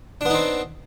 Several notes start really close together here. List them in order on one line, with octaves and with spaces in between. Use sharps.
D4 B3 D#4 C4